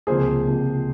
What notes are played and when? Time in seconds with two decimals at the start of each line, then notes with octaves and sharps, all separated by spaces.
0.07 C#2 C3 F3 A#3 G#4 C5
0.45 C#2 C3 F3 A#3